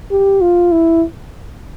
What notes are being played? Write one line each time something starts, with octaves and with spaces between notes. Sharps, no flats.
G4
F4
E4